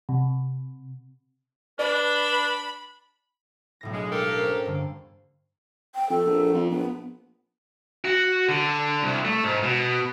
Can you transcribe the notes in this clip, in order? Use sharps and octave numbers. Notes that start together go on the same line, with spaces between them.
C3
D4 B4 D5 B5
B1 A2 A#6
G#3 D4
G4 A4 A#4 F5
A#3 C#4 C5
G2 D3
G5
F2 A4
A#1
F2
A#1 B3
F#4
D3
C2
A3
G#2
B2